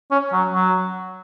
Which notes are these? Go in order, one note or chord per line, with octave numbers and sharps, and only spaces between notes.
C#4
F#3
F#3